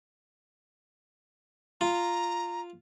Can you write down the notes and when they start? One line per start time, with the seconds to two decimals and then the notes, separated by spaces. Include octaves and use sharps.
1.81 F4 A#5